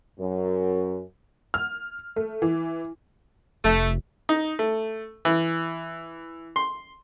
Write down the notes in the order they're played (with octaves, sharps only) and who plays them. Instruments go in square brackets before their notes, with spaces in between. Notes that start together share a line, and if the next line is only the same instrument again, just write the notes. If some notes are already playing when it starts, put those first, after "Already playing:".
[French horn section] F#2
[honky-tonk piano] F6
A3
E3
[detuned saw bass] F1 [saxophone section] A3
[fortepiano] D#4
A3
E3
C6